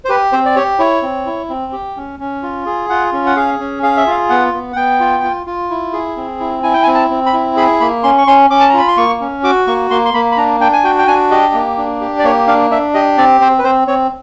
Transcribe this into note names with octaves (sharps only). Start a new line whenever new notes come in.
C5
G4 B4
C4 C5
D5
G4 C#5
E4 C#5
C4
E4
C4
G4
C#4
C#4
F4
G#4
F4 F#5
C#4
F#5
G#4 F5
C#4
G#4 F5
E5
F4 F5
B3 F#5
B3
F#5
B3 G5
F4
F4
F4
E4
G#4
C4
E4
E4 G#5
G5
G#5
C4
A5
C4
B5
E4
G#4 B5
A#3 B5
C#4 C6
C#6
C#4 C6
C#4 D6
A5
A#5
F4 B5
C6
A#3 C#6
C#4
F#4 D6
A#3 C#6
A#3 C6
C6
A#3 B5
B5
D4 A#5
D4 G5
G#5
F#4 G5
G5
D4 G#5
G4 D#5
A#3
D4
G4
D5
A#3 C#5
D4 F5
D4 E5
G4 D#5
C4 D5
C4 C5
B4
C4 C5
C4 C#5